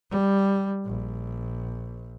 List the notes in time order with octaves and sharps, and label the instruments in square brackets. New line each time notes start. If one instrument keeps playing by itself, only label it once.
[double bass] G3
A#1